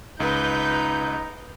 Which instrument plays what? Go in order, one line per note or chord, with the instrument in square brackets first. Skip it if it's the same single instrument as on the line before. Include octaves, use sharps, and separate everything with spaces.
[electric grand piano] C#2 [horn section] D#4 [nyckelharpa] B4 [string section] G6